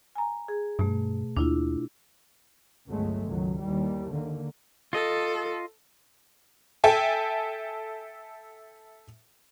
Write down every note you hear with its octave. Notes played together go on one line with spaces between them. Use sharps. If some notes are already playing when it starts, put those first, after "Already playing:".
G#5 A#5
G#4
G2 B2 A3
D#2 D4 E4 F4
G1 C#2 F#3 G#3 A3
C#2 D#3 F#3
D#2 E3 G3
D3 D#3 A#3
F4 A4 D#5
A4 E5 G5 G#5